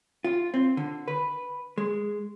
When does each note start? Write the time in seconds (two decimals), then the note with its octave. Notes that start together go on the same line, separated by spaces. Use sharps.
0.24 F4
0.54 C4
0.77 D3
1.08 B4
1.78 G#3